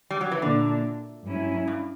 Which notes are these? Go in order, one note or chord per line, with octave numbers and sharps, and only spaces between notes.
G3
F#3
E3
A#2 D3 A#3 D4
G2 F#3 C#4 E4
G2